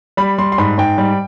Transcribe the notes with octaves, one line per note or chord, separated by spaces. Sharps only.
G3 B5
G3 C6
C6
G#2 B5
G#2 G5
G3